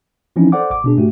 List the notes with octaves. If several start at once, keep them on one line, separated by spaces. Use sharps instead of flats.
E3 F3 C4 C#4 D#4 E4
A4 C5 D5 F#5 D6
G#1 D6
B2 D4 G#4
G#2 A3 F#4 G4